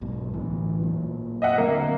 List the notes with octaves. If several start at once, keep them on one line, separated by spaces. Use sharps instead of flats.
B1 G#2 B2
A1 D2 E3
A#2 F#3
D#5 E5 F#5
D3 F#3 A#3 C4